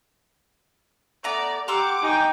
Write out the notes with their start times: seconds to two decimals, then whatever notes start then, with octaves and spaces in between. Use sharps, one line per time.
1.24 A3 B3 D5 A#5
1.68 G4 F#5 A#5 C6 D6 E6
2.02 D#4 G5 G#5